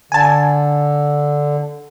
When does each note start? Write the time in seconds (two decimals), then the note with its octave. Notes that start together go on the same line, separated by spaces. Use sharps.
0.12 D3 G#5 A5